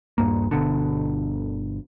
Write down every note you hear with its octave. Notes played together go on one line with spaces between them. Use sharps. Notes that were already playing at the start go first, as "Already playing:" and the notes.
D#1 G2 A#3
G1 B2 D3